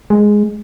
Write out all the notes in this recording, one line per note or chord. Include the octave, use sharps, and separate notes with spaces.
G#3